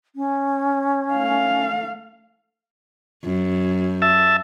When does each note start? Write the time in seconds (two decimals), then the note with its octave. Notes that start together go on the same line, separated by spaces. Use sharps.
0.15 C#4
1.13 A3 F5
3.24 F#2
4.02 E5 A5